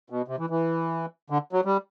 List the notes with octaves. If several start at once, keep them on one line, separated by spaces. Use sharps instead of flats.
B2
C3
E3
E3
D3
F#3
G3